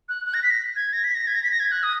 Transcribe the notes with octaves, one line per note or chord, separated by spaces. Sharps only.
F#6
F#6
A#6
B6
A#6
G#6
A#6
B6
A#6
G#6
A#6
B6
A#6
G#6
F#6
D#6